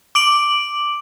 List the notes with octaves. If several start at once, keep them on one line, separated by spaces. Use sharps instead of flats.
D6 D7 F#7